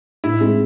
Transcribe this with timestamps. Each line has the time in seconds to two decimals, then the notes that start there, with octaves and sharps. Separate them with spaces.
0.24 A2 E4
0.40 G#3 C4 D#4 G#4